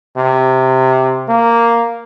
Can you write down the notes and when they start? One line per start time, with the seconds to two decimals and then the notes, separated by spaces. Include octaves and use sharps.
0.17 C3
1.29 A#3